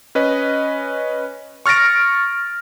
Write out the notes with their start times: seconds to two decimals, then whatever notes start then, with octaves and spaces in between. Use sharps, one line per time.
0.15 C#4 B4 D#5
1.66 C#6 F6 A6 A#6 D7